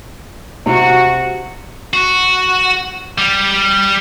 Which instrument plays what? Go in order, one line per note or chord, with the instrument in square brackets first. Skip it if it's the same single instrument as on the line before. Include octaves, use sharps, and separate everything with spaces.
[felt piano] C3 [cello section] F#4
[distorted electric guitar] F#4
G3